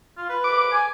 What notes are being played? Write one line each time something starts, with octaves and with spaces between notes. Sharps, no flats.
F4
B4
D6
G#5